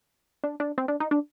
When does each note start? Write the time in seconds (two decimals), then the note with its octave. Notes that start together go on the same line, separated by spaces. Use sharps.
0.44 D4
0.60 D4
0.78 C4
0.88 D4
1.00 D#4
1.11 D4